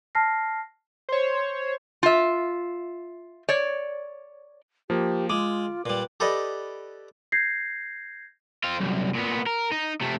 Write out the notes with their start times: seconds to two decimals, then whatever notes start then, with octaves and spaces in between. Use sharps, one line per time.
0.15 A5 F6 A#6 C7
1.09 C5 C#5
2.03 F4 E5
3.49 C#5 D5
4.90 F3 A#3 G4
5.30 G#3 F4 D6
5.86 A#2 G3 B4
6.20 G4 A4 B4 D5 D#5
7.32 G6 G#6 A#6 C7
8.64 C4 F4
8.80 C2 F#2
9.15 A#2 B3
9.46 A#4
9.71 D#4
10.01 C3 A3